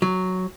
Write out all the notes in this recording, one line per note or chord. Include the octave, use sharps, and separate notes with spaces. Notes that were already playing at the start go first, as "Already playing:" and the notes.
F#3